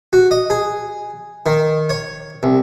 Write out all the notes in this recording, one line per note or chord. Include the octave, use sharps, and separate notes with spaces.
F#4
D#5
G#4
D#3
C#5
C2